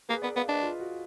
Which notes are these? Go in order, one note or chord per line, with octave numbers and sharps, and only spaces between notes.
A#3 G#4 B4
B3 A#4 D5
B3 D5 F5
D4 B4 D#5
F4
F#4